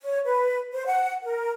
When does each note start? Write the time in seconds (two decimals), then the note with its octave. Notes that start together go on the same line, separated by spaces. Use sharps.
0.01 C#5
0.25 B4
0.73 C5
0.87 F#5
1.23 A#4